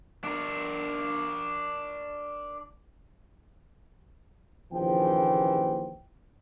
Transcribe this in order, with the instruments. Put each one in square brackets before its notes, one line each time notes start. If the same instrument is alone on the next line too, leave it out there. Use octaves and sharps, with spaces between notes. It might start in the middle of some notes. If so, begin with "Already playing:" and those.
[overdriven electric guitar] D4 A#4
[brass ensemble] A#1 D#2 C#3 E3 F3 G5